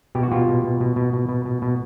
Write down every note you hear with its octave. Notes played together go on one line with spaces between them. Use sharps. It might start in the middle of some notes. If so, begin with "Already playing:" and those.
B2 G4
F#4
B2 F4 G4
B2
B2
B2
B2
B2
B2
B2
B2